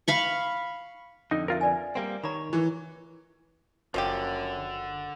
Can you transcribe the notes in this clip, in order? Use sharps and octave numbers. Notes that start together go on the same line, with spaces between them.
F5 B5 C#6
F2 D3 D#4
F4 A#4 B4 E5
B4 D5 G#5
G3 A#3 C4
D#3 C#5 A#5 B5
E3
F#1 F#2 D3 F3 F4 G4